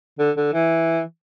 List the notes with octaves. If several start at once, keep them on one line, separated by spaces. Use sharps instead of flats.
D3
D3
E3